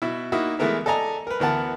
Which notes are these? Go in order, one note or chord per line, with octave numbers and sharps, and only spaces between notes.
B2 E4
A#3 D#4 E4 F#4
E3 G#3 A3 B3 A#4 E5
A4 D5 D#5 G#5 A#5
A#4 B4
D2 E3 B3 A#4 F#5 A5